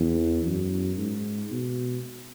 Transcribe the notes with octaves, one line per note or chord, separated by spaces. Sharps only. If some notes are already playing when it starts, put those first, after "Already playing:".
Already playing: E2
F#2
G#2
B2